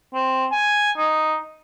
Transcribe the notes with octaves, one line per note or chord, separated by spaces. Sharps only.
C4
G#5
D#4